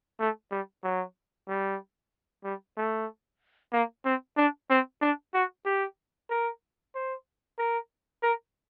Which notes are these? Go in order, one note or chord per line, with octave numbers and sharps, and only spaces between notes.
A3
G3
F#3
G3
G3
A3
A#3
C4
D4
C4
D4
F#4
G4
A#4
C5
A#4
A#4